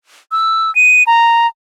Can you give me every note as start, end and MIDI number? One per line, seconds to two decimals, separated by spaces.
0.32 0.73 88
0.75 1.03 99
1.07 1.47 82